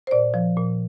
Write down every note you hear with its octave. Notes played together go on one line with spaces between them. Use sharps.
C5
A#2 D5
F3
A#2